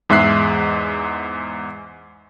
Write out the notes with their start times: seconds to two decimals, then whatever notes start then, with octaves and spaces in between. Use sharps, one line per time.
0.09 E2 G#2 G#3 E5 F#6 C7